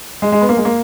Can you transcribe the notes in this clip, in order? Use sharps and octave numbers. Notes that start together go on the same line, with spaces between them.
G#3
G#3
B3
A#3
G#3
A#3